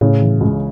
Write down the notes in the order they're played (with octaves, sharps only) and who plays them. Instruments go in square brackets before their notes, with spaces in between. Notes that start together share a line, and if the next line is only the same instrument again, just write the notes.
[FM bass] A2 [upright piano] C#3
[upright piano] E3
C#2